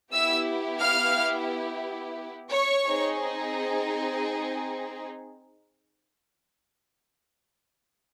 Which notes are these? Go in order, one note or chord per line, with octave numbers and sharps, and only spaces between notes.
B3 E4 G4 E5 E6
F5 F6
C#5 C#6
C4 D#4 G#4